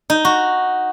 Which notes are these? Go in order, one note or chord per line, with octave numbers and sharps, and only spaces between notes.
D#4
F#4